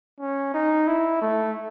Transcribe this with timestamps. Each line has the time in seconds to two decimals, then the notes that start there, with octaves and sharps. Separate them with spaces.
0.20 C#4
0.54 D#4
0.87 E4
1.22 A3